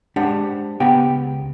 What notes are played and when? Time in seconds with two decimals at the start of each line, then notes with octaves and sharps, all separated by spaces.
0.16 G#3 D4 G4 C5 F#5
0.80 C#2 B3 G4 F#5 G5